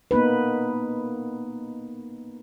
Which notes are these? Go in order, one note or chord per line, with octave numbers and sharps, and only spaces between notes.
A#3 B3 D#4 B4